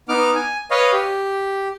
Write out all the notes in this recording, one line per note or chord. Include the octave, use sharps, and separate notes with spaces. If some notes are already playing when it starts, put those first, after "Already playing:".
B3 D#4 D6 F6
G#5
B4 C#5 D#5 F5
G4